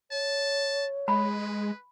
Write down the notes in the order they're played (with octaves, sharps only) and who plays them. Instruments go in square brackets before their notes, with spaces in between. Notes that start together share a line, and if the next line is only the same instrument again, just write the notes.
[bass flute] C#5 [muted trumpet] A5
[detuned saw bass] G#3 [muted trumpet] B4 [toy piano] B5